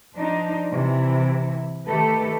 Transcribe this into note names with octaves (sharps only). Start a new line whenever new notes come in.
F3 D4 D#4
C3 E3 E4
D#3 A3 G4 A4 B4